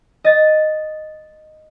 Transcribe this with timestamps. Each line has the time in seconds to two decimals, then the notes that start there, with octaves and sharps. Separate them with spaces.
0.24 D#5 A6